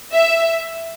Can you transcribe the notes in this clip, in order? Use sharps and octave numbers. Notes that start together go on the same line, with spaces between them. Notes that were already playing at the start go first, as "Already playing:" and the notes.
E5